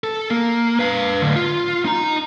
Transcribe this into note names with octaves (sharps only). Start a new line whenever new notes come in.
A4
A#3
B4 F5
A2 D3
F4
D#4 A#5